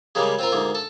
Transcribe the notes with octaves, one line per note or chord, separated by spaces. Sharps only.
C#3 G3 G#3 A#3
C4 F4 A#4
D2 G#2 A#3
A4